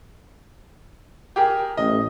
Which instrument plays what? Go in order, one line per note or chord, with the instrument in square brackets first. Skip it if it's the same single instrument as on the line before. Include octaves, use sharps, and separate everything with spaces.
[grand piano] G4 G#4 A#4
[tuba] A1 [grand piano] D#5